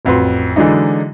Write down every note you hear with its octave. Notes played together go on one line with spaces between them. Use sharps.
A1 F2 F#4 B4 C6
D3 E3 F#3 G#3 D4 D#4